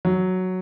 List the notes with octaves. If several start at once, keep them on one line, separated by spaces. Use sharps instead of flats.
F#3